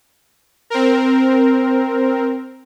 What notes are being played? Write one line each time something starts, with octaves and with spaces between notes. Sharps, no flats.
C4 A#4